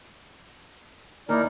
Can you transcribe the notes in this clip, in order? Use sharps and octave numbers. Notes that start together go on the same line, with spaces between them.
D#2 D#4 E4 A#4 D5